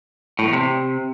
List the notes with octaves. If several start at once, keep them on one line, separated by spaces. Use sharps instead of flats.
A2
E2
C3